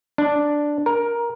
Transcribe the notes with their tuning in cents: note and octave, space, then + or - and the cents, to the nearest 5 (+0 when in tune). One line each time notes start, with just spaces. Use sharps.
D4 +0
A#4 +15